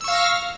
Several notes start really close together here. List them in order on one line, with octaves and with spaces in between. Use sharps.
E6 C#6 F5 A#6 F6